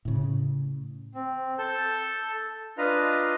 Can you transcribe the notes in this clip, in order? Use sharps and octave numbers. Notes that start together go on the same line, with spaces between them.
A2 C#3
C4
A4 A5 G6
D4 F4 B4 D#5 F5 A#5